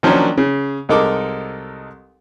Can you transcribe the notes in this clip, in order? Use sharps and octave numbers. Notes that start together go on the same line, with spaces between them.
D#3 F3 F#3 A#3 C#4 D4
C#3
C2 G#3 D#4 A4 A#4 D6